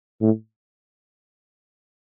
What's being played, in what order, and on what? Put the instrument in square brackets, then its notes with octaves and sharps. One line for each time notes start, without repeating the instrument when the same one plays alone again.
[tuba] A2